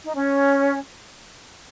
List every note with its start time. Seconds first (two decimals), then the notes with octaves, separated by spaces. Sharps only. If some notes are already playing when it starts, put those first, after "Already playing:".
0.05 D#4
0.14 C#4